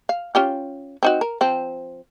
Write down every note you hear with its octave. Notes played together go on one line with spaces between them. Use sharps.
F5
C#4 F4 G4
C4 D#4 F#4
A#4
F3 C4